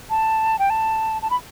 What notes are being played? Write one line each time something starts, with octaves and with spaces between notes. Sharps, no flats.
A5
G5
A5
A5
B5